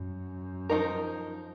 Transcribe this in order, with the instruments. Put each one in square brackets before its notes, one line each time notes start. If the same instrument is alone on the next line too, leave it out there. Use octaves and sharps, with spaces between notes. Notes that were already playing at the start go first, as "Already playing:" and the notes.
Already playing: [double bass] F#2
[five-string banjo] F3 A#3 D#4 A#4